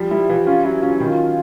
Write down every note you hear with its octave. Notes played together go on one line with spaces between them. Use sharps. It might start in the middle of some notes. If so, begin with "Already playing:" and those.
Already playing: F3 G3
G3 E4
E3 F4
C#4 F4
F#3 E4
C#4 F4
E4
D#3
F4